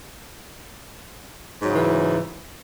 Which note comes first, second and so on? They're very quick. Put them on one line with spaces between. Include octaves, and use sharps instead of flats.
G#2 F#3 C#3 E3